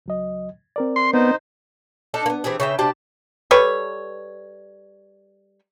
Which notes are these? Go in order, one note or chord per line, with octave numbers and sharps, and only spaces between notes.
C#2 F#3 D#5
C4 A#4 D5
C6
B3 D#4 C5
D4 D#4 A4
A#3 B3
E3 C4 G4 G#4
C#3 E5 G5
C3 D4 G4 A5
G3 A4 B4 C#5